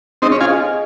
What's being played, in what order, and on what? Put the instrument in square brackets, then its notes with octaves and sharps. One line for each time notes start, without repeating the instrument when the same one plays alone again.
[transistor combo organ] C4 D#4 [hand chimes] G#4
[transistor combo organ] C#4
[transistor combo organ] F4 G#4 [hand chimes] G#5
[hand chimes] D#5
G#4